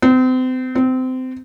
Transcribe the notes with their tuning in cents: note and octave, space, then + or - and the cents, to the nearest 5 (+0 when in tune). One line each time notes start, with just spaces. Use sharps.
C4 -35
C4 -25